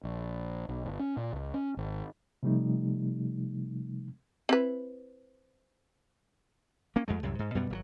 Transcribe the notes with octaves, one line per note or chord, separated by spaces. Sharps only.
A#1
B1
G1
C#4
A#2
C#2
C#4
G#1
C3 F3 G3 A3 D#4
C4 E4 B4
A#3 C#4
F2 G#3 A3
C2 F#2 A2
G#2
F#2 B2 G3 B3
G#1 D3 F#3